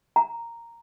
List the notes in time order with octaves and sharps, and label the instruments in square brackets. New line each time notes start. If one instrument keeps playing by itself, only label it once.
[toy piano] A#5